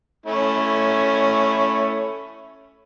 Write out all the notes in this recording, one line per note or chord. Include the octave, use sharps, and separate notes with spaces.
A3 C#4 E4